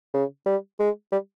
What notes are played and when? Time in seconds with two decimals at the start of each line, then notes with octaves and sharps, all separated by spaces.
0.14 C#3
0.46 G3
0.79 G#3
1.12 G3